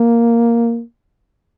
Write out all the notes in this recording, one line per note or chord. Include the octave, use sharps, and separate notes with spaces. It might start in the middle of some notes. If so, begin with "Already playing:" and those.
Already playing: A#3